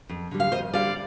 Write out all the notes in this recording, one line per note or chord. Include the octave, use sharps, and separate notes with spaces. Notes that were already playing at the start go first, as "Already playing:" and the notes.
F2
D3 G3
F5
F2 C5 D#5
D3 G3 D5 F5